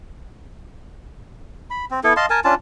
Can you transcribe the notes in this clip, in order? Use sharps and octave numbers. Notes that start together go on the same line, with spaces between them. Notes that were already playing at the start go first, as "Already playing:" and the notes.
B5
C4
B3 E4 A4
D#5 F5 A5 C6
A#4 G#5 A5
C#4 D4 F4 A5